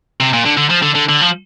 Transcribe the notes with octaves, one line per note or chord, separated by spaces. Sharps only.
C3
A#2
D3
D3
F3
D3
D3
D3
F3